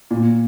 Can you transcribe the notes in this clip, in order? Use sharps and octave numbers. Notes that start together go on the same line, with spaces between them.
A#2